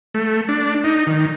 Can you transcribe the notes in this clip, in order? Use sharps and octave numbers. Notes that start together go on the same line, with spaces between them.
A3
D4
D#4
D#3